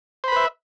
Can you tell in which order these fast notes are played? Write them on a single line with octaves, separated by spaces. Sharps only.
C5 B5 B4 E5